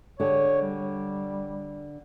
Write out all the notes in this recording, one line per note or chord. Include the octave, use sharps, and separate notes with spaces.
D3 G4 G#4 C#5
G3